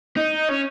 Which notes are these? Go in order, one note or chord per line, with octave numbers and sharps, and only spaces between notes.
D#4
C#4